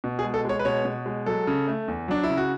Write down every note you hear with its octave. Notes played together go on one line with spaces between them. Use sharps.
B2
G#4
G#3
A4
G#3 C#5
B4
B2 C#5
B2
G#3
F#3 A4
C#3
A3
E2
F#3 D4
E4
C#3
F#4